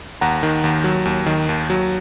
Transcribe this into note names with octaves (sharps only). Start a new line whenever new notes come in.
D#2 F#5 A#5
D#3
D#2
F#3
D#2
D#3
D#2
F#3